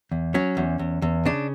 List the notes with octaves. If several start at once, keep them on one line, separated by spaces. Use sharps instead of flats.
E2
F#3 C#4
E2
E2
E2
C#3 D4